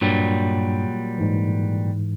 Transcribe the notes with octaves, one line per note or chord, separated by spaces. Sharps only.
G2 A#2 F#3 G3
G#2 E3